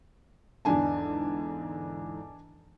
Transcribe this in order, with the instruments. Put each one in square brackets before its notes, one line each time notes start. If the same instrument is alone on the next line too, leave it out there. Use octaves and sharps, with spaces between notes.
[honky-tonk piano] E2 G#2 D3 [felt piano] D4 G#5 A5